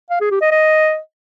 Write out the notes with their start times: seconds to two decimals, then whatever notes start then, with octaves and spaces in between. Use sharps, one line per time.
0.10 F5
0.21 G#4
0.31 G4
0.41 D#5
0.51 D#5